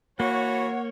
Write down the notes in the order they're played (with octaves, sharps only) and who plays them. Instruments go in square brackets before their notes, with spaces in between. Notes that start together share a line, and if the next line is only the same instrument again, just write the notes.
[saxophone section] E3 F#4 [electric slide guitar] A#3 [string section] C#5 [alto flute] F#5